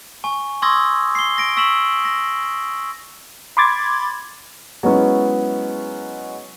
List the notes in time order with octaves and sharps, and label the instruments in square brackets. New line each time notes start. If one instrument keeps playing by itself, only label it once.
[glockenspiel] G#5 C#6
C6 C#6 D#6 E6 G#6 A#6
C7 G7
A#6 D7
C#6 E6 B6 E7 F#7
A#6
[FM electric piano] B5 C6 D6 G#6 A6
[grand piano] F#3 G#3 B3 C#4 E4